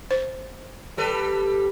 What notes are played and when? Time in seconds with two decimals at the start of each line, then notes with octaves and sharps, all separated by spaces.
0.11 C5
0.97 G3 A4 B4